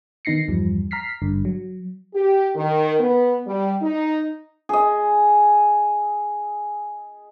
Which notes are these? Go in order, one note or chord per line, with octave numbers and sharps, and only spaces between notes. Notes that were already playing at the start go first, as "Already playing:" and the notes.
D#3 B3 D#4 A#6 C7 C#7
E2 G2 F3 G3
A#5 F6 B6 C7
G#1 G2 D3
F#3
G4
D#3
B3
G3
D#4
G#4 D#5